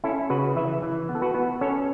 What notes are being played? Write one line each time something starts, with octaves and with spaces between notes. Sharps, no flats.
C#4 E4 A4
C#3 F#4 B4
E3 B4 E5
E3
B3
A4
F#4 B4
B3
C#4 A4 C#5